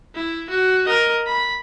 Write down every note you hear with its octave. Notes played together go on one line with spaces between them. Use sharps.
E4
F#4
A#4 D#5
B5